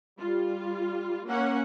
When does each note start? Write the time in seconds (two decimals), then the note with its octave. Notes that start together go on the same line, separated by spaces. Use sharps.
0.19 G3 F4
1.25 A#3 C#4 F#5